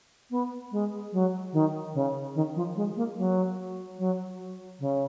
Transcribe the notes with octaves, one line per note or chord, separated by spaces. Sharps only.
B3
G#3
F#3
D#3
C#3
D#3
F3
G#3
A#3
F#3
F#3
C#3